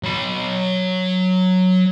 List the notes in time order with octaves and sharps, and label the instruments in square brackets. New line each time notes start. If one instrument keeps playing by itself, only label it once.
[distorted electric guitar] F#3 B5